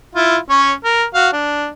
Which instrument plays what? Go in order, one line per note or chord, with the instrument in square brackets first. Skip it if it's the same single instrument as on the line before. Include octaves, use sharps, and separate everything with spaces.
[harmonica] E4 F4
C#4 C#5
A#4
F#4 F5
D4